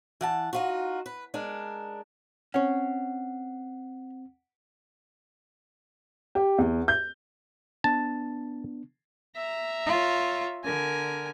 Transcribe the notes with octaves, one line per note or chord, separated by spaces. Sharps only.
E3 F#5 A5
D#4 F4 F#4
B4
G#3 D4 A#4
C4 C#4 C#5 F#5
G4
E2
G6
B3 D4 A5
E5 A#5
F4 C#5
D3 A#4 G#5